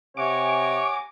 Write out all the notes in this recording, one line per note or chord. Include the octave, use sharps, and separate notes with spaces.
C3 C#5 F#5 G#5 A#5 D6